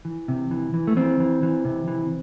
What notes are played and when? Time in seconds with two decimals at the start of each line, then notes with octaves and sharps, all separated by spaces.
0.05 E3
0.28 C3
0.51 E3
0.74 E3
0.87 A3
0.97 E3 C4
1.20 E3
1.43 E3
1.65 C3
1.88 E3